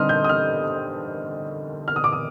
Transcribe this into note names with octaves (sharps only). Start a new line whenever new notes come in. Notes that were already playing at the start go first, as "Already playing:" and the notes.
Already playing: D3 G3 C4 D#4 C6 D#6 F6
G6
D#6
F6
F6
D#6
D6
D#6